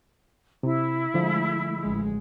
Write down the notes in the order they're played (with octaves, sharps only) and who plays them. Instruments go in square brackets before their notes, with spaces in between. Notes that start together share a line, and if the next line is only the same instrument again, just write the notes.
[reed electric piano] C3 [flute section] E4
[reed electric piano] D3 F3 [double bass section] G#3 A3
[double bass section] A1 G#3